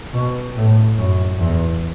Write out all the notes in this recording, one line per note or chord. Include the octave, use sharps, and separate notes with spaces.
B2
A2
F#2
E2